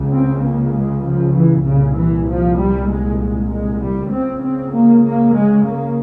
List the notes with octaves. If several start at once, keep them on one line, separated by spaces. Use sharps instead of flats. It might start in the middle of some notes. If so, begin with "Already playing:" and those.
Already playing: C#2 C#3
C4
A#3
G#3
F3
E3
C2 A#2 C#3
E3
F3
G3
G#3
G#3
G#3
G3
C#2 C#3 C4
C4
A#3
A#3
G#3
A#3